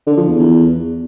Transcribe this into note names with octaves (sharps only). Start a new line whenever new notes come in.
D3
F3
E2
E2